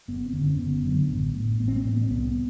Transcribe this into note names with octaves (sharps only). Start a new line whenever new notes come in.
F#1 B3
C4
D3
F#2 C#4
F#1 B3
F#2 D3
A1
A2
A1 B3
C4
B3
A2 C4
B3
C4
C2 B3